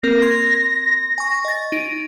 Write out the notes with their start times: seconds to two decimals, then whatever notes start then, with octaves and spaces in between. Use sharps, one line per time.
0.03 A#3 C4 A#4 A#6
0.22 C6 G#6
1.18 G#5 C#6
1.45 D#5 A6
1.72 D#4 D7